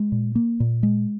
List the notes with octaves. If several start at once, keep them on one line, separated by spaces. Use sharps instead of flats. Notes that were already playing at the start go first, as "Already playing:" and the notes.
Already playing: G#3
A#2
A#3
A#2
G#3